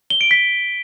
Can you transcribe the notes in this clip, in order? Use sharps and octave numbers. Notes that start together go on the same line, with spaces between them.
G7
D7
B6